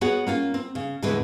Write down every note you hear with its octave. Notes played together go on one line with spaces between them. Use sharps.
B3 F#4 G#4 C#5 F#5
A#3 C#4 F4
C4
C#3
E2 A2 D3 G#3 C4 B4